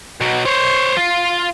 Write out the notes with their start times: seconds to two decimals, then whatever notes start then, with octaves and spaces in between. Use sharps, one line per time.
0.21 B2 F#3
0.46 C5 C#5
0.97 F4